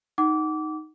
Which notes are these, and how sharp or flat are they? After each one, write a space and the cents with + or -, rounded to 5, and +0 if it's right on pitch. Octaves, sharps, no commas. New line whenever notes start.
D#4 +0 F#5 +20 D6 -20